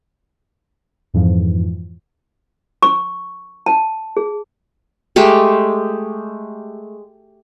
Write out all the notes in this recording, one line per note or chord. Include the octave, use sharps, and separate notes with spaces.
F2 G#2 E3 F3
C#6
A5
G#4
G#3 A3 G4